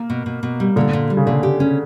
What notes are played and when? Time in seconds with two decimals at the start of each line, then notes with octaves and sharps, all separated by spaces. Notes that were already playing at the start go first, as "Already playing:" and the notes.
Already playing: A#3
0.10 B2
0.26 B2
0.43 B2
0.60 G3
0.76 A#2 D3
0.93 A#2
1.10 G3
1.17 C#3
1.26 A#2 D3
1.43 G4
1.60 C#4